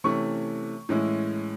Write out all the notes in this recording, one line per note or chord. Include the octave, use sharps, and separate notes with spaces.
C3 E3 A3 C#4 C#6
A2 E3 G#3 C#4 E4